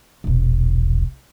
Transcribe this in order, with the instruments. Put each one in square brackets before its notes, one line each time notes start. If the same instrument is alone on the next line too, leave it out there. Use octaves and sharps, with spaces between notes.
[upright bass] E1 A#1